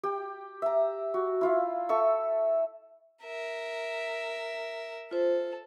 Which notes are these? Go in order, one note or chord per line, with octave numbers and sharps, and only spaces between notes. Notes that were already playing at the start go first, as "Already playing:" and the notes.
G4 G5
E5 A#5
F#4
E4 F4 F5
A4 E5 C#6
A#4 E5
F4 A4 C5